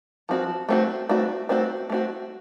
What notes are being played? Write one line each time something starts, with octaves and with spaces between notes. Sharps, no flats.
F3 C4 F#4
A3 C4 F#4
A3 C4 F#4
A3 C4 F#4
A3 C4 F#4